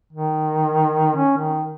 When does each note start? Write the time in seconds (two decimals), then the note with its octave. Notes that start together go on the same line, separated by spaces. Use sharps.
0.13 D#3
1.16 C#4
1.38 D#3